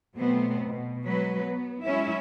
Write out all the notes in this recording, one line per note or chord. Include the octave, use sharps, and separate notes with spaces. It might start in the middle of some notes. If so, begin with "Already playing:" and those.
B2 F#3 A3 B3 C4
B2
F#3 G#3 B4
B3
F#3 G#3 C#4 E4 E5